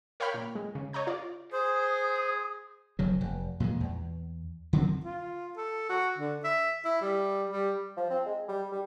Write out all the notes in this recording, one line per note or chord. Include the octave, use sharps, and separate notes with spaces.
A#4 C#5 F5 G5 B5 F6
A#2
G#3
C#3
C#5 D#5 A#5 G6
F4 D5
G#4 C5 D#6
F1 C#3 F#3
F1
A#2 E3 F#3 G#3
E2
D3 D#3 F#3 C4
F4
A4
F#4
D3
E5
E4
G3
G3
F3
C4
G#3
G3
G3